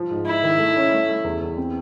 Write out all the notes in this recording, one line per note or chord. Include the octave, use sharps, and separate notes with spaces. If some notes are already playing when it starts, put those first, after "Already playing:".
Already playing: F3
G#2
D#4 E4
D#3
A3
C#4
A3
A3
E2
E2
C4